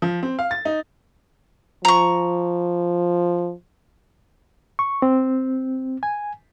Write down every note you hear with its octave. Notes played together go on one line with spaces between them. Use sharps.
F3
C4
F5
A6
D#4
F3 A#5 C#6
C#6
C4
G#5